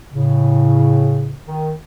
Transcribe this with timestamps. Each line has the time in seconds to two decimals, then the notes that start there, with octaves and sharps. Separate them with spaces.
0.11 A2 C#3
1.46 D#3